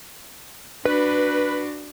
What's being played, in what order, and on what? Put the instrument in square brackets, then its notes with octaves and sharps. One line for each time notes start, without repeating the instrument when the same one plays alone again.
[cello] D4 F#4 [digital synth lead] B4